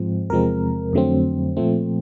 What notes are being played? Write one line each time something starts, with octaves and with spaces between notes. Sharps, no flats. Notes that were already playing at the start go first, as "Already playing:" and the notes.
Already playing: G#2 F3 G#3 C4
E2 C3 F3 G#3 C4 A#4
F2 D3 F#3 A3 C4
A#2 F3 A3 C4